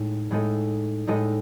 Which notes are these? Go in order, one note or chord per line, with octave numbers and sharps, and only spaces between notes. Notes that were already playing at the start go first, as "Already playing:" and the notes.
Already playing: A2 G#3 D#4 A4
A2 G#3 D#4 A4 D#5
A2 G#3 D#4 A4 D#5